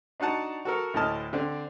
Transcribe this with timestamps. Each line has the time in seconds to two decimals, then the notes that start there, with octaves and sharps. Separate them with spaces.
0.20 D4 D#4 F#4 F#5 A5
0.65 F#4 A4 A#4
0.94 D2 A2 E4 D#5 A5 F6
1.33 D3 C4 D4